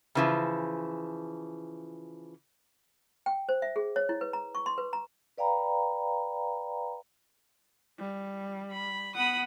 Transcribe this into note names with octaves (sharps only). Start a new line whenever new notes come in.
C#3 E3 F3
G5
C5
E5
G#4
C#5
E4
B4
A#5
C#6
C6
B4
A#5
B4 D5 F5 G5 A#5 B5
G3
B5
B3 F#5 B5 D#6